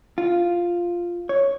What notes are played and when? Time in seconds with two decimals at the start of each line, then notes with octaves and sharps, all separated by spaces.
0.18 F4
1.29 C#5